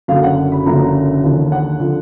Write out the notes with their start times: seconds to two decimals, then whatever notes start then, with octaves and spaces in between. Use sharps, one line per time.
0.08 F#1 F#2 D3 F5
0.23 F#5
0.52 B5
0.66 F#1 F#2 D3 F3 A#5
1.23 D#2 D3 F3
1.52 F#5
1.80 D3 F3